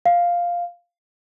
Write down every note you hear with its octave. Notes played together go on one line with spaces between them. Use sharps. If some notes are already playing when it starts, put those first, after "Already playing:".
F5